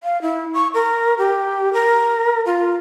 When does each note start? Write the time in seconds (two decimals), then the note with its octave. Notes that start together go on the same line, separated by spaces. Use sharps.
0.04 F5
0.22 E4
0.54 C#6
0.74 A#4
1.18 G4
1.73 A#4
2.46 F4